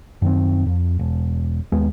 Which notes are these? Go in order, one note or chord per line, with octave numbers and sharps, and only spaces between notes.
F#2 D#3 C4
F2
E1
D#2 G#3 B3